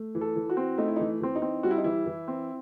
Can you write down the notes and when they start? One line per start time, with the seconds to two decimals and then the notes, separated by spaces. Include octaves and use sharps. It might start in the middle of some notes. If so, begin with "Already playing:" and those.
Already playing: A3
0.15 E3
0.21 A4
0.36 E3
0.49 F#4
0.57 C4
0.78 A3 D#4
0.88 E4
0.96 E3 D#4
1.21 E3 C4
1.35 D#4
1.42 C4
1.63 G3 F#4
1.71 E4
1.78 D#4
1.84 E3 E4
2.06 E3
2.28 C4